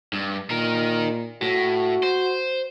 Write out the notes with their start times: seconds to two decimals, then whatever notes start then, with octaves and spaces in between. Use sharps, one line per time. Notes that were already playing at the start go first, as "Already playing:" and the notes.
0.13 G2
0.50 A#2 D#4 A#4
1.42 A2 F#4
2.03 C5